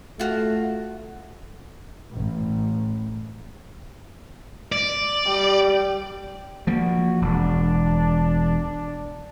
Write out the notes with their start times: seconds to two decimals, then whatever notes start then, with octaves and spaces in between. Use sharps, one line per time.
0.19 A3 F4 F#4
2.12 A1
4.72 D5
5.27 G3
6.67 F3 A#3 F#4
7.22 E1 D4